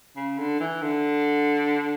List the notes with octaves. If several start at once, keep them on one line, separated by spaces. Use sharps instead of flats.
C#3
D3
E3
D3